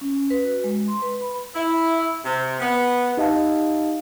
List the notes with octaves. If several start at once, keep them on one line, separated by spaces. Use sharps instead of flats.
C#4
C#4
B4
F#4
G#3
C6
B4
B5
E4
C3
B3
D#4 G4 D#5 F5 A5